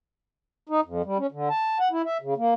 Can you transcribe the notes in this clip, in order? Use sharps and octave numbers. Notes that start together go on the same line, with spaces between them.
D#4
F2
G3
C#4
D3
A5
F#5
E4
E5
C#3
A#3